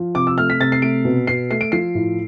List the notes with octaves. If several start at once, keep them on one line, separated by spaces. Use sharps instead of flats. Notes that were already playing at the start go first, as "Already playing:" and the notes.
Already playing: F3
C3 D6
E6
A3 F6
B6
C3 A6
C7
A3 D7
B2
B2 C7
A3 C7
D7
F3 C7
A2